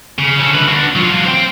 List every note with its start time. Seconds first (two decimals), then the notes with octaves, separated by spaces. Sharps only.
0.18 C#3
0.39 C#4 A4
0.51 D3 B4
0.67 D4 F#4
0.96 F#3 F4
1.25 C5 G5